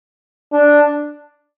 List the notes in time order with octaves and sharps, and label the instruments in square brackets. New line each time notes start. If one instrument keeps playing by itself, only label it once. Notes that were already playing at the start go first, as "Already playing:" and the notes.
[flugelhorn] D4